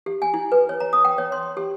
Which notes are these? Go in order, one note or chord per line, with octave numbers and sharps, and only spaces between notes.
G4
G#5
E4
B4
C#5
A#5
D#6
G5
C#5
C6
G4